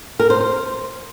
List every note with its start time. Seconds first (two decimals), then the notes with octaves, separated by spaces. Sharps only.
0.19 A#4
0.30 C5
0.40 C5